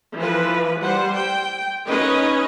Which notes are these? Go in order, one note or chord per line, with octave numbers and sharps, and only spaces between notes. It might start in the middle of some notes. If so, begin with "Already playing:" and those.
E3 F3 B4
G3 C5 F#5
G5
C#4 D#4 B4 D#5